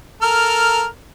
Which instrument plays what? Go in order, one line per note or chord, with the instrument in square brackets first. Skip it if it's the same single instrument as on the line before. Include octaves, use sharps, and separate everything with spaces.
[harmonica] A4 A#4 F6